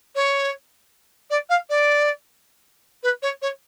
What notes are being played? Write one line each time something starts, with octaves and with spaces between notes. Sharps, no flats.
C#5
D5
F5
D5
B4
C#5
C#5